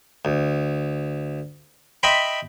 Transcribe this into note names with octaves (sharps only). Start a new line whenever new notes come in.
D2
D#5 E5 G5 B5 C6